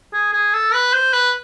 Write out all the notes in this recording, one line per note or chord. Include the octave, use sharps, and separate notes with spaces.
G#4
G#4
A4
B4
C5
B4